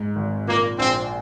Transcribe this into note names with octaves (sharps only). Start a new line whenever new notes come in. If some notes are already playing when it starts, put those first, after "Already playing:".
Already playing: G#2
G#1
A#2 A#3
A#1 C4